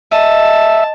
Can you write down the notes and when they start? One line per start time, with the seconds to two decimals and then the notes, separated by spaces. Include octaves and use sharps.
0.12 D#5 E5 A5